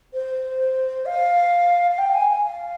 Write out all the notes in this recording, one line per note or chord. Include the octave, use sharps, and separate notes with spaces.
C5
F5
F5
G5
G#5
G#5
F5